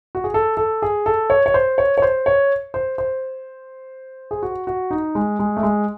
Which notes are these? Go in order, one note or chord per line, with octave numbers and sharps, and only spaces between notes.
F#4
G#4
A4
A4
G#4
A4
C#5
C#5
C5
C#5
C#5
C5
C#5
C5
C5
G#4
F#4
F#4
D#4
G#3
G#3
A3
G#3